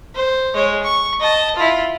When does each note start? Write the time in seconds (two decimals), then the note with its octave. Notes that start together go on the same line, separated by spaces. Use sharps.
0.15 C5
0.54 G#3 C#5
0.83 C#6
1.20 D#5 A5
1.56 E4 F4